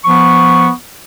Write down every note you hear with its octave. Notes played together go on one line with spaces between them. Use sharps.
F3 B3 C#6